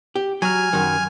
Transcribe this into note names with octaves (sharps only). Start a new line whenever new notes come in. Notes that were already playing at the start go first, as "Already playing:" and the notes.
G4
F#3 G#5 F6
F#2 D#3